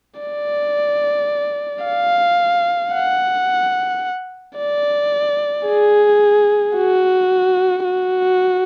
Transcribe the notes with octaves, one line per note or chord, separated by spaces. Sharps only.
D5
F5
F#5
D5
G#4
F#4
F#4